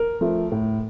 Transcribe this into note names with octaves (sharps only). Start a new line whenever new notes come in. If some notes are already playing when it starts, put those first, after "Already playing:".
Already playing: A#4
F3 A3
A2